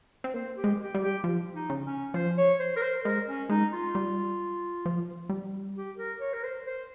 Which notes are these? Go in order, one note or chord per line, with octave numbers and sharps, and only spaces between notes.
C4
A#3 C5
G4
G#3
G4
G3
G4
F3
D#4
C#3
C#4
F3 C5
C#5
C5
A#4
C5
G#3 A#4
C#4
G#3 D#4
F4
G3
F3
G3
G4
A#4
C#5
A#4
C5
C5